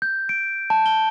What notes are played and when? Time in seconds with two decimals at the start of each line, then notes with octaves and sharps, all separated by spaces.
0.02 G6
0.29 D7
0.70 A5
0.86 G7